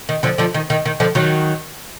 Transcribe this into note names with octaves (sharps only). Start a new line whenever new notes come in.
D#3
D3 F3
D3 F3
D#3
D#3
D#3
D3 F3
D#3 F#3